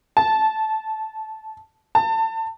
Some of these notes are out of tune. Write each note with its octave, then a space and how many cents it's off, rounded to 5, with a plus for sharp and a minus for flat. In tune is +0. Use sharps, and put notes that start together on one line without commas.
A5 -10
A5 +30